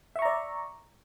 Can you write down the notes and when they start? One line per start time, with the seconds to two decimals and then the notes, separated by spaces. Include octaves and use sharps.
0.16 E5
0.19 C#6
0.22 A#5
0.25 D5